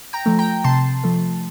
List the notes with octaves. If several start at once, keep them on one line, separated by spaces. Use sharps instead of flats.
G5 A#5
F3 A3
G5 A#5
C3 A5 C6
F3 A3